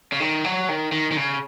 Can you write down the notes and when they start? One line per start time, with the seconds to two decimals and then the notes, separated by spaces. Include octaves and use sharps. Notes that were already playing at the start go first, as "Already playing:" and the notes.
0.12 C#3
0.20 D#3
0.44 F#3
0.69 D#3
0.92 D#3
1.11 D#3
1.17 C#3